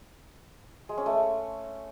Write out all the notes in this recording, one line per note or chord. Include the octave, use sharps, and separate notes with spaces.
G#3
C#4
A3